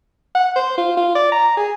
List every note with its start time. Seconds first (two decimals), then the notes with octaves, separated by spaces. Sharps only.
0.35 F#5
0.56 C5
0.78 F4
0.97 F4
1.16 D5
1.32 A#5
1.57 G#4